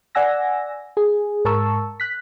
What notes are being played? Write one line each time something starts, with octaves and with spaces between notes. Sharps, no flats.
D5 F#5 G#5 E6 A#6
G#4
G#2 A#4 A5 C#6 E6
F#6 B6